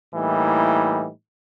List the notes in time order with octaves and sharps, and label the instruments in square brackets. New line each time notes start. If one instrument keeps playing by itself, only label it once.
[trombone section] A2 E3 G3 A#3 D#4